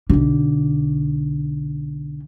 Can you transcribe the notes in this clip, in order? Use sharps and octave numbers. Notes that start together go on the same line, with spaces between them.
B1 D3